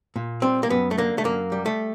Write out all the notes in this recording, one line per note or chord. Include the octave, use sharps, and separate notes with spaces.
A#2
G3 C4
A#3
F#2 B3
A3
D3 A#3
A3
F#2 A#3
G3
A3